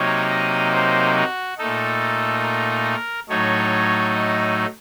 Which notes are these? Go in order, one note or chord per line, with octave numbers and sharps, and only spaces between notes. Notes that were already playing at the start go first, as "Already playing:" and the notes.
Already playing: C3 F#3 A#3 D#4 C#5
D#5
C5
F#4
A#2 A3 D#4 A4
A#4
A2 F#3 A3 D#4 C#5
D#5